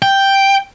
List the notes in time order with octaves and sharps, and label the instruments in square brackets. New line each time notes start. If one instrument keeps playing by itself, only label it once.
[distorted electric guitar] G5